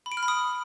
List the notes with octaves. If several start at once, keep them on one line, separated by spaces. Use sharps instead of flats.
B5
D7
F6
B5
D#6